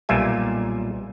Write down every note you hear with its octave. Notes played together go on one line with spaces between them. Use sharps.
B1 A#2 G3 F4 E5 G#5